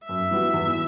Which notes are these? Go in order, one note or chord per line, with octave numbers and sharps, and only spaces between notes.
F#2 E5
E3 G3 B3 F#4
E2